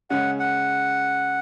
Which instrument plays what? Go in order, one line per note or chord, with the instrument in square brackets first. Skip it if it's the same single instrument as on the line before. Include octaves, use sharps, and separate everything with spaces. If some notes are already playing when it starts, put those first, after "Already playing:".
[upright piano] C#3 G#3 C#4 [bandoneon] F#5
[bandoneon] F#5